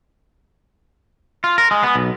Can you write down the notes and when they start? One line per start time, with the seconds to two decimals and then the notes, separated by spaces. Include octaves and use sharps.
1.44 F4
1.58 A#4
1.71 G#3
1.83 B3
1.96 B1